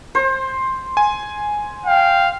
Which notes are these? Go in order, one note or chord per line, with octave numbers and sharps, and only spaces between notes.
C5
G#5
F5 G5